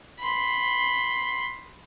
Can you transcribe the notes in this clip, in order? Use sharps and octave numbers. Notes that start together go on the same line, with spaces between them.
B5 C6